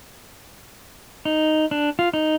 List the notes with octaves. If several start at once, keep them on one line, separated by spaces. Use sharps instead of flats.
D#4
D4
F4
D#4